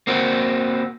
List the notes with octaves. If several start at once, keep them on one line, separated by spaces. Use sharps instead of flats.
A#3 C4 F#4